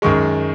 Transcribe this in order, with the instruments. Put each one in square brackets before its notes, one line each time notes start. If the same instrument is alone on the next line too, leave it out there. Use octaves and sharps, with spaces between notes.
[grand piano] F#2 D#3 G#3 C#6